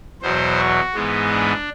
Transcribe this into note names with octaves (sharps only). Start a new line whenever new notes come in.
E2 B2 F#3 C5
F#4
G#2 E3 G#3 B3
D4